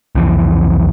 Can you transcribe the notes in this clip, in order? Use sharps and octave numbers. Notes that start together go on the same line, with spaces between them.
C2 F2 E3